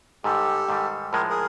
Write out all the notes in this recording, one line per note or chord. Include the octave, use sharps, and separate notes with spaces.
G#2 D#3 G3 G4 A4
G#2 D#3 G3
A2 F3 G#3 A#4
G#4 A#4